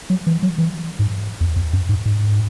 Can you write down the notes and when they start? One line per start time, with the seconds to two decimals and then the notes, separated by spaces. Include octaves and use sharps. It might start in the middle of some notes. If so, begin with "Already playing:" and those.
0.10 F#3
0.27 E3
0.43 F#3
0.58 E3
0.99 G#2
1.41 E2
1.56 E2
1.73 F#2
1.89 G#2
2.06 G#2